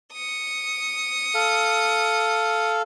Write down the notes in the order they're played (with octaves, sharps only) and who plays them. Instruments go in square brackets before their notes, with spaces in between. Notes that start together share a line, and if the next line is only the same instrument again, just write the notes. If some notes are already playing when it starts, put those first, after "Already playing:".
[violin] D#6 C#7
[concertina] A4 F5